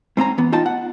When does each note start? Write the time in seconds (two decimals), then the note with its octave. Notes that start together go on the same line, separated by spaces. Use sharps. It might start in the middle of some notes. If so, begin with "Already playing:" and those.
0.17 G#2 C4 C#4 A#5
0.38 E3 B3
0.52 D#4 F4 D#5 G5 A5
0.66 F#5